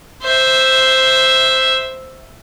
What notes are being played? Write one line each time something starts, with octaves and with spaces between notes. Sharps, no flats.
C5 E5